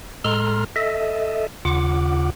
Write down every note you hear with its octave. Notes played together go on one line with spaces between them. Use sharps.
A2 G#3 A4 A#5 C6 F6
A4 D#5 E5
D#2 C#3 F4 F#5 D6